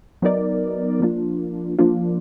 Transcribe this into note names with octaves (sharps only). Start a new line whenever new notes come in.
F#3 B3 D#4 A#4 D5
F3 A#3 D4 F4
F3 A#3 D4 F4